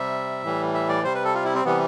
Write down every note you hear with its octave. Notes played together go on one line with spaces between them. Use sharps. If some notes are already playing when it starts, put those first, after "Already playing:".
Already playing: C3 G3 E5
A2 E3 G3
E5
D5
C3 G3 C5
B4
A4
F4
E4
C4
C3 E3 G3 B3